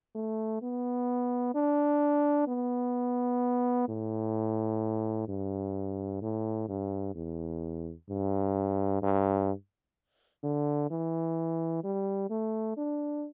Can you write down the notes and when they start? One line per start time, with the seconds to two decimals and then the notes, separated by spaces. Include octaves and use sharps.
0.15 A3
0.62 B3
1.55 D4
2.48 B3
3.89 A2
5.29 G2
6.22 A2
6.69 G2
7.15 E2
8.10 G2
9.03 G2
10.43 D3
10.90 E3
11.84 G3
12.30 A3
12.77 D4